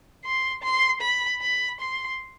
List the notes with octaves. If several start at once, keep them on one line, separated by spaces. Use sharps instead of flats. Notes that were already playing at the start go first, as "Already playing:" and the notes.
C6
C6
B5
B5
C6